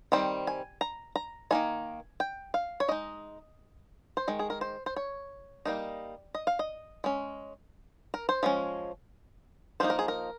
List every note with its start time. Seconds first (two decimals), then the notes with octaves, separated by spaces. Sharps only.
0.12 D#3 G3 C4 C5
0.47 G#5
0.81 A#5
1.16 A#5
1.51 D#3 A#3 D#4 G#5
2.20 G5
2.54 F5
2.80 C#5
2.88 G#3 D#4 D#5
4.17 C5
4.28 D#3 G#3
4.39 G#4
4.50 A#4
4.61 C5
4.86 C5
4.96 C#5
5.66 G3 A#3 D#4
6.35 D#5
6.47 F5
6.59 D#5
7.04 G#3 C#4
8.14 A#4
8.29 C5
8.43 F3 G#3 C#4
9.80 F3 A#3 D#4 C5
9.90 A#4
9.99 G#4
10.08 A#4